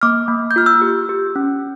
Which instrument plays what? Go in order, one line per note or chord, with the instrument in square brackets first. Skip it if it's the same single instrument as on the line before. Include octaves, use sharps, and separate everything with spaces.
[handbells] A#3 D6 F6
A#3
G6
F4 F6
E6 G6
G4
G4
C#4